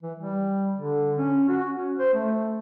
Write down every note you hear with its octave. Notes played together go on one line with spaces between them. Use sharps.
E3
G3
D3
C#4
F#4
C#4
C5
A3